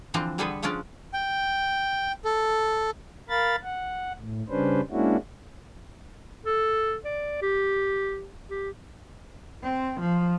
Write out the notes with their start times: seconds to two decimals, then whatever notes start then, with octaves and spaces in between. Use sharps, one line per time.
0.14 D3 E3 F3 C4 D4
0.38 D3 G3 B3 G#4 A4 B4
0.63 C#3 F3 G#3 C#4 D4 D5
1.13 G5
2.25 A4
3.29 A#4 F5 B5 A6
3.63 F#5
4.18 A2
4.49 C#3 G3 C#4 D4 B4 C5
4.91 G#3 A#3 C#4 D4 E4 F#4
6.45 A4
7.05 D5
7.42 G4
8.50 G4
9.63 C4
10.00 F3